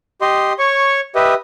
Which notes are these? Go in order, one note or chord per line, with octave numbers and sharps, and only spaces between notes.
G4 D#5 C6
C#5 C#6
G4 B4 D#5 E5